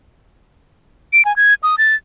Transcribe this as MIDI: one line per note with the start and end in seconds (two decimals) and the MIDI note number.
1.13 1.25 98
1.25 1.35 80
1.36 1.54 92
1.63 1.76 87
1.78 1.95 93